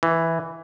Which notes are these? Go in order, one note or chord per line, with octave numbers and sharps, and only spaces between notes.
E3